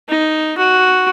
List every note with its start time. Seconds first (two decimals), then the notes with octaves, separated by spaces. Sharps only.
0.09 D#4
0.57 F#4